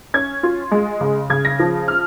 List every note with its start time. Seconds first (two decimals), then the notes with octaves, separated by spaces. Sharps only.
0.14 C#4 G#6
0.43 F4
0.71 G#3
1.01 C#3
1.30 C#3 G#6
1.45 A#6
1.59 F3
1.88 F6